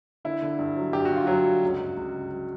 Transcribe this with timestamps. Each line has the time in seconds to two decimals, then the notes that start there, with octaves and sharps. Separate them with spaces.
0.25 D3 E4
0.42 D3
0.59 G2
0.76 F#3
0.93 G2 G4
1.05 F#4
1.10 D3
1.16 F4
1.26 F#3 F#4
1.45 G2
1.63 C#2
1.80 C#2
1.97 C#2
2.14 C#3
2.31 F#3